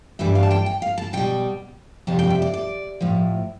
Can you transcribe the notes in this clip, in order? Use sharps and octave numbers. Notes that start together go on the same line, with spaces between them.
G2 E3 G3 E5
F5
A5
G5
G5
F5
A5
B2 G3 G5
F2 C3 G3 A5
G5
E5
D5
D5
A2 F3